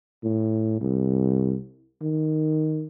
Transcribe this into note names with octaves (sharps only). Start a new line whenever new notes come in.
A2
C2
D#3